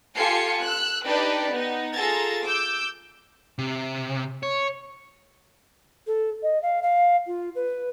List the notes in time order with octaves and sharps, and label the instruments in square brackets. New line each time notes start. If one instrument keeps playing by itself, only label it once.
[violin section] F4 G4 A4 G#5 C7 C#7
E6 F#6
D4 D#4 G4 B4 D5
B3 D#4
F4 G#4 A4 A#5 A6
D6 E6 G6
[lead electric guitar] C3
C#5
[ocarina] A4
D#5
F5
F5
F4
B4